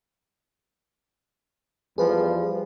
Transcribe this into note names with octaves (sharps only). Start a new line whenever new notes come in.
E2 F3 G3 G#4 B4